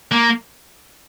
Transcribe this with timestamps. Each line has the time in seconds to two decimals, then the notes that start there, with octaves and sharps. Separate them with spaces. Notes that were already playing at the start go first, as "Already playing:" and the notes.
0.12 A#3